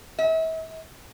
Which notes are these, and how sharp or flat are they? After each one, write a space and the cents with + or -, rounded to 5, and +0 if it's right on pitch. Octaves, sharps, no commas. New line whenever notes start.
E5 -40